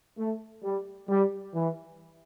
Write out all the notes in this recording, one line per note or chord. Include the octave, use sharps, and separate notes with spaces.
A3
G3
G3
E3